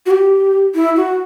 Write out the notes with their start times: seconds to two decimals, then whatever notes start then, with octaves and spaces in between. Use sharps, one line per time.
0.06 F#4
0.11 G4
0.75 E4
0.96 F#4